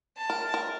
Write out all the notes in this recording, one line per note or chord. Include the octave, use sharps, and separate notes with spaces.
A5
A#4
A#4